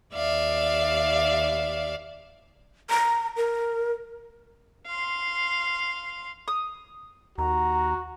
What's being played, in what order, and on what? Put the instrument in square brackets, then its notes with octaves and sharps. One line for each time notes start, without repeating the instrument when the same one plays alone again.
[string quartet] D#2 D5 E5 F5
[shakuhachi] A#5
A#4
[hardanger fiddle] F5 C6
[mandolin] D#6
[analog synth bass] D#2 [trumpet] F#4 [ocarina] A#5